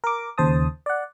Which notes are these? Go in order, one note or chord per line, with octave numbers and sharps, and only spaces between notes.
A#4 D6
D#2 C#3 C5 A5 D#6
D5 F#5